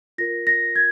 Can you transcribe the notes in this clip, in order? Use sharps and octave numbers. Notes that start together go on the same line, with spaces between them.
F4 A#4 A#6
A#6
G#6